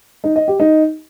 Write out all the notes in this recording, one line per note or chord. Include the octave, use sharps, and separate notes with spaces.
D#4
D#5
G4
D#4